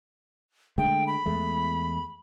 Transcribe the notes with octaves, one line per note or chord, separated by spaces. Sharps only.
D3 G#3 A3 G5
B5
E2 G#3 A3